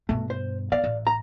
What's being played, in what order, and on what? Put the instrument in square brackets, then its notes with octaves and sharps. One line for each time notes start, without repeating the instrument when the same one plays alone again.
[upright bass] G2 B2 [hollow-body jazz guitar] A3
[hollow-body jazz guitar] C5
[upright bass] B3 [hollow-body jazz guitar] D5 F5
[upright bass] A1
[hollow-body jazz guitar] A#5